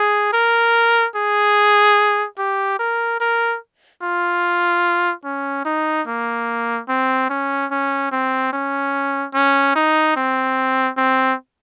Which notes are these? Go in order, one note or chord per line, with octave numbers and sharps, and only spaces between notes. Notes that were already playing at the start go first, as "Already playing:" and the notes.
Already playing: G#4
A#4
G#4
G4
A#4
A#4
F4
C#4
D#4
A#3
C4
C#4
C#4
C4
C#4
C#4
D#4
C4
C4